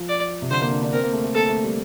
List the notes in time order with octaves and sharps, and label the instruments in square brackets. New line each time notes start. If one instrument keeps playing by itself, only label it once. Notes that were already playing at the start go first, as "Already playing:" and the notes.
Already playing: [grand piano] F3
[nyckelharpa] D5
[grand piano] C3
[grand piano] D3 [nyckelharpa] C5
[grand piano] A#3
D4
D4
[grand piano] C4 [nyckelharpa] A#4
[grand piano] A#3
A3
A3
[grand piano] A#3 [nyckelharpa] A4
[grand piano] A3
G3